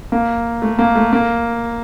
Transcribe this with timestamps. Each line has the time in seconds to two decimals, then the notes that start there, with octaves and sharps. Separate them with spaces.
0.12 A#3
0.62 A3
0.79 A#3
0.96 A3
1.13 A#3